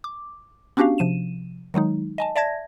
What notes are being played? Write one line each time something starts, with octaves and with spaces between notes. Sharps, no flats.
D6
B3 C#4 D4 F#4 G4 F5
C3 F3 D#7 E7
D#3 F#3 G#3 D#4
D#5 G#5 A5
D5 E5 A5 G#6 A#6